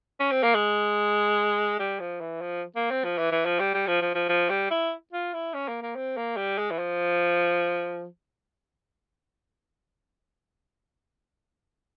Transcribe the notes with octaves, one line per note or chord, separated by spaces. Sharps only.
C#4
C4
A#3
G#3
G3
F3
E3
F3
A#3
C4
F3
E3
E3
F3
G3
G3
F3
F3
F3
F3
G3
E4
F4
E4
C#4
A#3
A#3
C4
A#3
G3
G#3
E3
F3